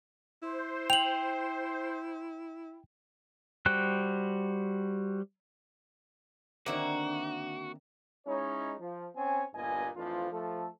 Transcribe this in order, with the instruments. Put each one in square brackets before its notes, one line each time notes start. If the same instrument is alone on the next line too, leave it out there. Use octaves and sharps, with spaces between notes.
[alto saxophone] E4 [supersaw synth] C5
[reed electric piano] G5 [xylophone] F7 F#7
[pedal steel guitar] G3 F#4 C5 G5 F#6
[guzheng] D3 D#3 C4 [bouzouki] A#3 E5 [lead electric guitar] F#4
[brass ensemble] G#3 C#4 D#4 E4 C#5
F3
C4 C#4 C#5 G#5
G1 G2 A#2 B3 D#5 G#5
F2 E3 F3 A3 D4 F4
F3 A3 A4